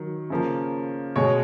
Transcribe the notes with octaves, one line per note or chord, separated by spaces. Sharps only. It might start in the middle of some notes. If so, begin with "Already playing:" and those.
Already playing: D#3 F#3
C#3 F3 A#3
B2 G#3 C#5